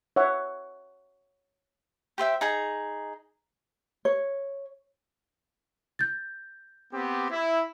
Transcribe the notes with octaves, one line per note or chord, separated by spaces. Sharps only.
C#5 E5 F#5 C#6
G4 C5 E5 G5
D#4 G#4 A#5
C#5
G6 A6
B3 C4 G4
E4